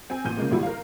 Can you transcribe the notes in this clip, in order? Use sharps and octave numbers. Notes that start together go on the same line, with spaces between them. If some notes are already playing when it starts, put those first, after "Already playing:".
C4 G#5
A1 A#2 G6 D#7
C#3 F3 G#3 A#3
G#1 G3 E4 F#4
A#4 F5